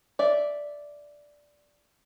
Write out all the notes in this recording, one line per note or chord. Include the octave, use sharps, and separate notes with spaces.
D5 E5